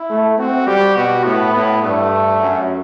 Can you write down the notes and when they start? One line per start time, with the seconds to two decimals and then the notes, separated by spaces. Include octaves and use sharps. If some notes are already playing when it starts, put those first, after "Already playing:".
Already playing: E4
0.10 A3
0.38 C4 F#4
0.67 G3 G4
0.96 B2 F#4
1.24 A2 B3
1.54 A2 B3
1.82 G2 A3
2.40 F#2